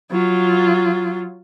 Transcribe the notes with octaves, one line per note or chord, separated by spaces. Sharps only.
F#3 F4